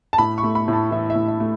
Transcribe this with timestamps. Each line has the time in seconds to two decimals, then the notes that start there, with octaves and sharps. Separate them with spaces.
0.13 A5
0.18 A2 B5
0.38 C#6
0.43 A3
0.55 B5
0.68 A2
0.73 A5
0.91 E3 E5
1.10 E5
1.15 A2
1.28 E5
1.40 A3